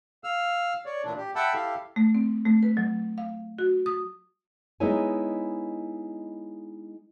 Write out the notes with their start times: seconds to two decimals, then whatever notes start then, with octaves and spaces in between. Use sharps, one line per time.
0.24 F5 E6 F6
0.86 C#5 D5
1.04 A#2 E3 D4
1.17 G4
1.36 E5 F#5 G5 A5 B5 E6
1.54 E4 G4 A4 F5
1.96 A3
2.15 C4
2.45 A3
2.63 B4
2.77 F#3
3.18 F5
3.59 F#4
3.86 D#6
4.80 G#3 B3 D#4 E4 C#5 G#5